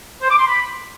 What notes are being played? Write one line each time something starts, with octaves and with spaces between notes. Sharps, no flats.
C5
D6
C6
B5